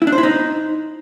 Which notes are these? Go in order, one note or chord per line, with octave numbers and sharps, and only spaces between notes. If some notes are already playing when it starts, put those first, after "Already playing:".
E4
D4
C5
E4
D#4